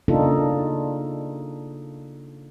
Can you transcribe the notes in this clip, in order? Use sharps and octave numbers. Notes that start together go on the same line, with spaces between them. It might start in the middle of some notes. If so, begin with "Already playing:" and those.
C#3 A#3 D4 D#4 F4 A4